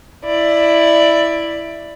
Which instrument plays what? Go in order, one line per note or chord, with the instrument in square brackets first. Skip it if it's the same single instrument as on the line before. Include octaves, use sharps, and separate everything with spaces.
[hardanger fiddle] E4 D5